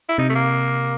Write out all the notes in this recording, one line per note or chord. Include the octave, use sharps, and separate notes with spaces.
E4
C3 D#4
A3
A#3